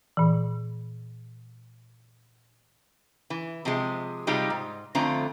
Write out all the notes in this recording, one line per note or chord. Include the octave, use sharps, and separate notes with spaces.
A#2 E3
E3
C3 F3 G#3
C3 G3 G#3 D#4 F4 G4
G#2
F2 D3 A3 C4 F4 A#5